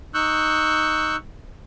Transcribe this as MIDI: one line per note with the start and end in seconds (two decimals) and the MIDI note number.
0.14 1.16 63
0.14 1.16 85
0.14 1.16 88
0.14 1.16 90
0.14 1.16 91